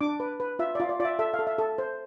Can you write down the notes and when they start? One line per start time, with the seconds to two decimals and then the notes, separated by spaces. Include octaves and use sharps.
0.01 D4 D6
0.20 B4
0.40 B4
0.59 F4 E5
0.75 F4 D5
0.89 D5
1.00 F4 D5
1.05 E5
1.19 A4 E5
1.34 F5
1.39 A4
1.47 E5
1.58 A4
1.78 C5